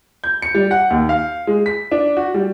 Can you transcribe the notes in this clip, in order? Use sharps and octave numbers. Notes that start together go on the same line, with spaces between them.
G6
C#7
G3
F#5
D#2
F5
G#3
B6
D4
F#4
G3